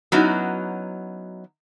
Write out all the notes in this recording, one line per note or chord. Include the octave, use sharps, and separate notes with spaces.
F#3 B3 C#4 D#4 E4 F#4